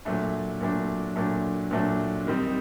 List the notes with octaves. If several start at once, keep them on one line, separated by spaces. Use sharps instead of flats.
A#2 F#3 A3 D4
A#2 F#3 A3 D4
A#2 F#3 A3 D4
A#2 F#3 A3 D4
D#3 G3 C4 D#4